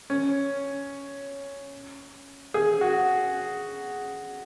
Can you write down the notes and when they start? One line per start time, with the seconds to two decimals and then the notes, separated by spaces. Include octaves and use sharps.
0.10 C#4
2.54 G#4
2.81 F#4